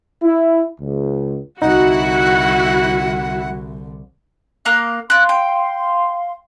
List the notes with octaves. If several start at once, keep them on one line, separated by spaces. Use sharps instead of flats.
E4
C#2
C2 D3 D#4 E4 F#4 F#5
A#3 F5 F#6
D5 F5 C6 F#6
G5